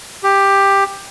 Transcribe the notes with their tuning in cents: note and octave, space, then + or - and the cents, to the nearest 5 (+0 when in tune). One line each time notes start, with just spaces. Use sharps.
G4 +10